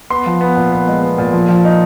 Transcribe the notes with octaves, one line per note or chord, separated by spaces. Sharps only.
B3 C6
F3
B3
A#2
B3
G#3
B3
A#2
F3
F3
D#4